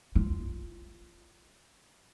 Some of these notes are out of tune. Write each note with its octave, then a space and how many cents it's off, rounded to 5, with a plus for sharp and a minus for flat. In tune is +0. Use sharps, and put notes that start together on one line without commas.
F4 -15